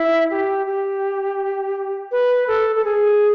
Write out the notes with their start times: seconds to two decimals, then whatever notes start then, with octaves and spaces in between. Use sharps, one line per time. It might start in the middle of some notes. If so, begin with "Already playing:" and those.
Already playing: E4
0.31 G4
0.67 G4
2.12 B4
2.48 A4
2.76 A4
2.84 G#4